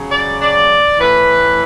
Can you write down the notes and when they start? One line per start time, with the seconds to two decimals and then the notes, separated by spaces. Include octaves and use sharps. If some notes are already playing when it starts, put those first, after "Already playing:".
Already playing: C#3 F#3
0.11 D5
0.40 D5
0.99 A2 E3 B4